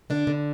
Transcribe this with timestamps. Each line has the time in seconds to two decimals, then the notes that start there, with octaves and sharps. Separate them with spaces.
0.10 D3 D4
0.27 D3